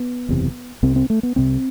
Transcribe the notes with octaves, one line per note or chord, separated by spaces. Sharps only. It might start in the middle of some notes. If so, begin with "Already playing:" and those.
Already playing: B3
F#1 E2 C3
C2 C3 C4
C4
A3
B3
C2 C3 C4